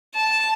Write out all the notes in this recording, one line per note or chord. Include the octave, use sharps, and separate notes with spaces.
A5